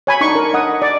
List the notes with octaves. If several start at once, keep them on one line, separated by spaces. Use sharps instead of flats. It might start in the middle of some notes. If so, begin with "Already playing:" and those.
C#5 G#5 B5
D4 D#4 C#6
A#4
D#5 F#5 D#6
D5